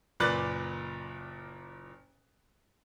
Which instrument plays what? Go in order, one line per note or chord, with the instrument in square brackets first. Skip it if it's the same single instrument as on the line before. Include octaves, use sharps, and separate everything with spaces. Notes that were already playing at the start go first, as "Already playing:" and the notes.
[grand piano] F#1 A#2 B4 D5 F#6 A6